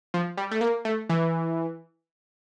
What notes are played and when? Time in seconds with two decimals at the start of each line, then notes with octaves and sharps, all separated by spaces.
0.14 F3
0.37 G3
0.51 A3
0.61 A#3
0.85 A3
1.09 E3